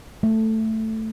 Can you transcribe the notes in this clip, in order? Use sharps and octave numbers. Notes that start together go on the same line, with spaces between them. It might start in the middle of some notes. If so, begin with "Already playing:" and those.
A3